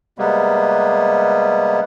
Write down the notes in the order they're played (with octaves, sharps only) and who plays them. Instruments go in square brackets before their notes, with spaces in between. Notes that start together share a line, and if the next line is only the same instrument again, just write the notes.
[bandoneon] C3 G3 G#3 A#3 B3